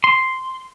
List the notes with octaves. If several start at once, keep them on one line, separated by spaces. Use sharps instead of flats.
C6